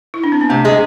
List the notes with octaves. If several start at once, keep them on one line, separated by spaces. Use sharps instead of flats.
E4
D4
C4
B3
C3 A3
G#3